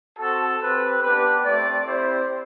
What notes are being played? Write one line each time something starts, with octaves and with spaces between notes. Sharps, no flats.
C4 F#4 A4
C4 G4 B4
B3 D4 G4 B4
A3 C4 G4 D5
C4 E4 G4 C5